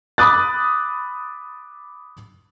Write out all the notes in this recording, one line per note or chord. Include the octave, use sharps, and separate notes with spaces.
B5 D6 D#6 F#6 A6